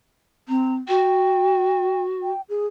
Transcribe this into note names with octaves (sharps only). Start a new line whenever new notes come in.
C4 A#5
F#4 G5
G5
G#4